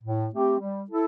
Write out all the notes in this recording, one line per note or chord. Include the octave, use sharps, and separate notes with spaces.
A2
A3 C4 G4
G3
E4 A4